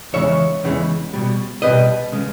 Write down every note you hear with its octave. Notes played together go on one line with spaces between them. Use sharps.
E2 C#3 E3 G#3 C#5 E5
E2 C#3 E3 G#3
B2 G3
B2 G3 B4 D#5
C#3 G#3